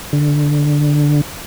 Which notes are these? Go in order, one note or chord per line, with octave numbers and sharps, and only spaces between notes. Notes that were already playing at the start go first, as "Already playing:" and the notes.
D3